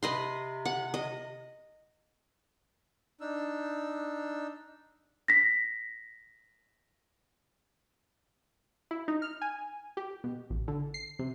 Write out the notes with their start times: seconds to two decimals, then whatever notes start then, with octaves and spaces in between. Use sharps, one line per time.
0.03 C3 B4 D#5 C6
0.65 F#5
0.94 D#5
3.21 D4 D#4 E6
5.28 A#6 B6
8.91 E4
9.08 D#4
9.22 F6
9.41 G#5
9.97 G4
10.24 B2
10.50 A1
10.68 D3
10.94 C7
11.19 C3